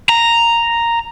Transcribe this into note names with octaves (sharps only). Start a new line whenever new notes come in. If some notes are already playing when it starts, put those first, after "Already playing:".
A#5